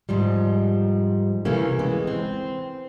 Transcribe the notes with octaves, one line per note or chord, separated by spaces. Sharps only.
G#2 F3 G3
C3 E3 A3 A#3 C#4
E3 G#3 B3
C4